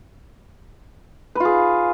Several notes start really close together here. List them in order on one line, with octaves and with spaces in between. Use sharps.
B4 F4 G#4